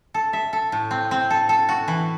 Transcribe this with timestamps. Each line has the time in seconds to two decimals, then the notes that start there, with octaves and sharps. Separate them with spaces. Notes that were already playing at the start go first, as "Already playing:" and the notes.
0.14 A4
0.33 E5
0.53 A4
0.72 A2
0.91 C4
1.11 C4
1.30 A4
1.49 A4
1.69 F#4
1.88 E3